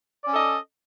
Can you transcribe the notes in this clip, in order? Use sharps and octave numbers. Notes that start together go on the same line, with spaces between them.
C#4 A4 D5 D#5